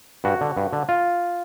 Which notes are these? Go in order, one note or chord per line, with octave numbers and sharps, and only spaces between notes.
G2 F#4
D3
G2
D3
F4